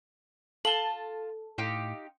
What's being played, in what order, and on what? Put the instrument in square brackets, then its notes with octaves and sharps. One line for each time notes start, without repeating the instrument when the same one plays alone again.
[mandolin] F4 A5 [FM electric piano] A4 [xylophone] F#7 G7
[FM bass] A2 [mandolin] D#4 F4 G4